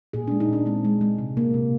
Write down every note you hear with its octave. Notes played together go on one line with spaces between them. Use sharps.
A#2 G#4
G#3 D4
D#4
A#2 D4
G#3 C4
G#3
G#3
C3
A#3
C3